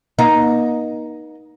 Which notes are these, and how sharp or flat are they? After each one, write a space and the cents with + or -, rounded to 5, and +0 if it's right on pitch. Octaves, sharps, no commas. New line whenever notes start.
A#3 +45 D#4 +0